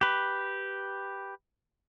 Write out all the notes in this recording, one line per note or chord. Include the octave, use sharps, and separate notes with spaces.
G4 B4